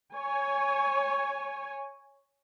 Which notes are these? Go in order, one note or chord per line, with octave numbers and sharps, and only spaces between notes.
C#5 G#5